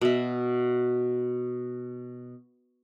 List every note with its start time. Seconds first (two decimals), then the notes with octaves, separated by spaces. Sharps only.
0.01 B2 E5